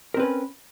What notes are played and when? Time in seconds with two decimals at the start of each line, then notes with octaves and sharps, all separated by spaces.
0.14 A#4
0.17 C4
0.19 B4
0.22 C#4